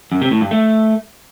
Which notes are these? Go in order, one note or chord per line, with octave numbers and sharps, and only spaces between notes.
F#2
C3
A2
G2
A3